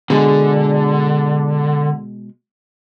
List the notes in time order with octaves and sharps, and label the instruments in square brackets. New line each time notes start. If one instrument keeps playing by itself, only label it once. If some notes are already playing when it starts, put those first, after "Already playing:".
[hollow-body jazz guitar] B2 G#3 G#4 [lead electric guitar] D3